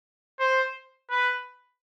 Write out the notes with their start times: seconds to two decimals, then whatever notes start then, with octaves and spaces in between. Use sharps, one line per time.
0.39 C5
1.10 B4